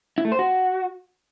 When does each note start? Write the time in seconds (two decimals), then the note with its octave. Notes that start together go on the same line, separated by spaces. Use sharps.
0.18 E4
0.25 A3
0.32 C5
0.39 F#4